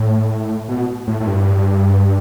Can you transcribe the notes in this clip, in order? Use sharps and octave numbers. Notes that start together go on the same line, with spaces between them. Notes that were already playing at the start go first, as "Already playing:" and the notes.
Already playing: A2
B2
A2
A2
G2